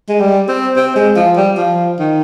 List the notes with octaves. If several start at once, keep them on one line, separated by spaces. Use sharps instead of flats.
G#3
G3
C4
C4
G#3
F3
G3
F3
D#3